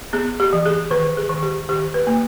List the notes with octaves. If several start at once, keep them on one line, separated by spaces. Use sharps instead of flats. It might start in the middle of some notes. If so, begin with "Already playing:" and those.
B3 G#4
G4
E3
G#4
D#3 B4
G#4
D#3
G4
D#3 G4
B4
A#3